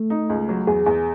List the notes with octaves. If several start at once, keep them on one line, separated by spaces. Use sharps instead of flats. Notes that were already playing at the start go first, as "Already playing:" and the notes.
Already playing: A3
D#4
C#2
F#3
E2 G#4
E2